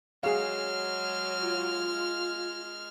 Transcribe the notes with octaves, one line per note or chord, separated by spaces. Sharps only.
F#3 G#3 G#4 F5 F6
F4